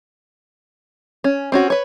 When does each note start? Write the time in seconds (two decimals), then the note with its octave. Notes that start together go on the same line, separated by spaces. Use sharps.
1.24 C#4
1.52 C4 C#4 F#4
1.70 B4 C#5